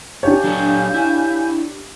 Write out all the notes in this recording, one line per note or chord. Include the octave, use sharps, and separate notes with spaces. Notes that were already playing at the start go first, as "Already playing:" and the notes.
D4 G4 C#5 F5 G#5 G6
F#3 F#4 A4
E4